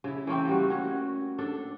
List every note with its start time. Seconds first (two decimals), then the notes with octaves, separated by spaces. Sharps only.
0.04 C#3 E4
0.27 E3 A3 A#3 C4
0.48 G3 F#4
0.70 C#4 F#4
1.38 D4 A4